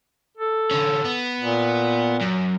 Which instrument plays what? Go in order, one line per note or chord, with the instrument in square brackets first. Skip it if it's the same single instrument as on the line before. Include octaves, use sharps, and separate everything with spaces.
[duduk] A4
[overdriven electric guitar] D3 C#4
B3
[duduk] A#2
[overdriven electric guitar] F#2